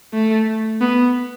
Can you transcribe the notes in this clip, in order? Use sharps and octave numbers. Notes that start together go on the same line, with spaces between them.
A3
B3